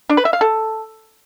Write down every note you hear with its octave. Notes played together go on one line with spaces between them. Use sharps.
D4
B4
E5
F5
A4